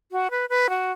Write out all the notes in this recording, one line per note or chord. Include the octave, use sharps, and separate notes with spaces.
F#4
B4
B4
F#4